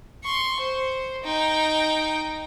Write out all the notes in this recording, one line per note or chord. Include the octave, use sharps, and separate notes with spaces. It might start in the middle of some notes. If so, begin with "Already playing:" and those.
C6 C#6
C5
D#4 G5